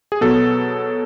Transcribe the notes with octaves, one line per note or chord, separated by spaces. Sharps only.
G#4
B2 F#3 B3 A4